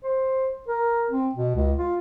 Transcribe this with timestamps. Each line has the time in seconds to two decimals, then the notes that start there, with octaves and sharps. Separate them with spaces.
0.04 C5
0.68 A#4
1.10 C4
1.35 B2
1.55 C#2
1.78 F4